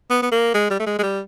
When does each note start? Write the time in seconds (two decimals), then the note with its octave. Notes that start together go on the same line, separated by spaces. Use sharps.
0.10 B3
0.23 B3
0.32 A#3
0.54 G#3
0.70 G3
0.80 A3
0.86 G#3
0.99 G#3
1.03 G3